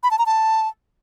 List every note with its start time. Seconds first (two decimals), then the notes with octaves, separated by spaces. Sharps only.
0.03 B5
0.11 A5
0.18 A#5
0.26 A5